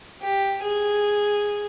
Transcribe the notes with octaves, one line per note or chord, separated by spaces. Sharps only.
G4
G#4